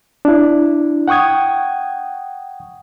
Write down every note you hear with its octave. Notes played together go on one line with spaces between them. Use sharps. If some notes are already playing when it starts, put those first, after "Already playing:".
D4 E4
F#5 G5 C#6 D#6 G#6